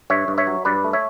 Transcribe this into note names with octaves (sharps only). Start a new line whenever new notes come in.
G2 C#5 E5
G2
C#5 E5
F#3
G2 B4 D5
A3
C#5 E5